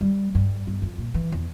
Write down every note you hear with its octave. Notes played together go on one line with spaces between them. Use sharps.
G3
G2
G1
F2
A#2
E3
E2